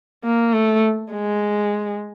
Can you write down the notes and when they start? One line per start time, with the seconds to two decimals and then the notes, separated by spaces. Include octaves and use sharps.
0.24 A#3
0.53 A3
1.12 G#3